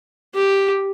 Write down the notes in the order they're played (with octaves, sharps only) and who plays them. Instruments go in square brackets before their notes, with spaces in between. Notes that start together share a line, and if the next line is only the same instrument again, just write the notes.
[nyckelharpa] G4